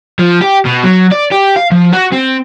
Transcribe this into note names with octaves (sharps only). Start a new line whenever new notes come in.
F3
G4
B2
F#3
D5
G4
F5
F3
F#4
C4